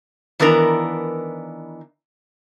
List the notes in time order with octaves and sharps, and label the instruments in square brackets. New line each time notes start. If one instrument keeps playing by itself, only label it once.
[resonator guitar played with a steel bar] D#3 E3 B3 D4 A#4 A#5